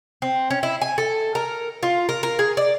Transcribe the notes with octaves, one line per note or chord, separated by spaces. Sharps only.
C4
C#4
E4
G#5
A4
A#4
F4
A#4
A#4
G#4
D5